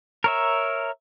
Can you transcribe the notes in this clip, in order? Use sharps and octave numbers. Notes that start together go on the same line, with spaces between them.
A#4 C#5 E5